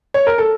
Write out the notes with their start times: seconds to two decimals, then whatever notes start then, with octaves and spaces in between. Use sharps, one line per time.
0.14 C#5
0.27 A#4
0.38 A4